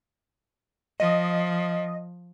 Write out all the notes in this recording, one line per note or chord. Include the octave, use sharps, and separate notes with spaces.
F3 D#5